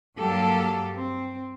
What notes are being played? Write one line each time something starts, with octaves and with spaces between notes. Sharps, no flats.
G2 F#3 A#3 G4 A4
C4